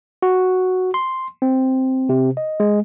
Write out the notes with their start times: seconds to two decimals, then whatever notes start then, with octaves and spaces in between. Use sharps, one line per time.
0.22 F#4
0.94 C6
1.42 C4
2.09 C3
2.37 D#5
2.60 G#3